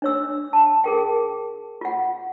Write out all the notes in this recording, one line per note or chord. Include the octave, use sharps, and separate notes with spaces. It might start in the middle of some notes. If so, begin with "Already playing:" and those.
D4 C#5 E6
A5
G#4 A#4 G5
F4 F#5